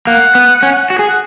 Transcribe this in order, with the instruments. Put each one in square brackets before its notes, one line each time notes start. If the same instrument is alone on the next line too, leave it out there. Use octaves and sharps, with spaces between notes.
[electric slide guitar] A#3 [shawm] F#5
[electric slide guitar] B3
C#4
F#4
G#4
[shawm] F#5